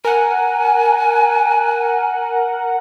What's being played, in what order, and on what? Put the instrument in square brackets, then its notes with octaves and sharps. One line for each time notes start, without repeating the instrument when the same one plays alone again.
[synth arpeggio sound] A#4 F#5 [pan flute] G#5